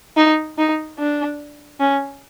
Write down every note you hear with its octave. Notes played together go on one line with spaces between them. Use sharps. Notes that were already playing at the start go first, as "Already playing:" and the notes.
D#4
D#4
D4
C#4